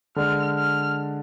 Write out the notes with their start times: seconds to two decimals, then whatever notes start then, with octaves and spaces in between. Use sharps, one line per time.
0.16 D3 G#3 D4 F6
0.58 F6